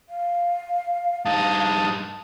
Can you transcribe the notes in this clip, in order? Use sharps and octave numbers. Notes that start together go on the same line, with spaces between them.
F5
G2 D#4 A5 D#6